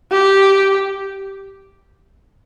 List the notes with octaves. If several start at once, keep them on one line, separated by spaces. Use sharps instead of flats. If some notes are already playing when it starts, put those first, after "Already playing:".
G4